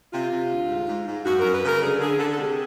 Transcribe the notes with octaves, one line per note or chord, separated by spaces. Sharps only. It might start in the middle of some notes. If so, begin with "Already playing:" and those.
C3 F4
C3
D2
G#2
G#2
G#2
F#2 F#4
F#2 A#4
B4
C#3 A#4
D3 G#4
D3 G#4
D3 A4
A4
C3 G#4